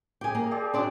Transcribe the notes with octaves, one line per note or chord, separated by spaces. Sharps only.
G4 G#4 G5 G#5
A#3
G4 G#4 D5
F#3 D4 D5 C6